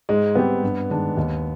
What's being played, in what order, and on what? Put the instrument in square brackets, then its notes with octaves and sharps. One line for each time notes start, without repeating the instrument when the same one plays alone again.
[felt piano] G#2 [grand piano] G#3
[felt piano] G3 C4 G4 [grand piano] B3
[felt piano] G2
D#3 G#3 D4
D#2